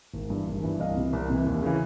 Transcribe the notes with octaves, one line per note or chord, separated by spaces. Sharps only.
G#1
G2 E3
G#1
G2 E3
C2 D#5 F5
C3 E3
C2
C3 E3
D#2
C#3 E3